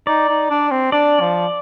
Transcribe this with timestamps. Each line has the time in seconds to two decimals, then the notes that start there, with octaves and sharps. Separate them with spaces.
0.07 D#4 D5
0.29 D#4
0.50 D4
0.71 C4
0.92 D4 D5
1.21 F3